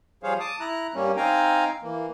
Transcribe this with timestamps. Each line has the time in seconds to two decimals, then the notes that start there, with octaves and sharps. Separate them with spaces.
0.23 F3 G3 G#4 C5 C#5 F5
0.40 A5 D6 D#6
0.60 E4 A#5 F#6
0.94 G2 G3 A#3 C#4
1.17 C4 D#4 F5 G5 G#5 A#5
1.82 E3 A#3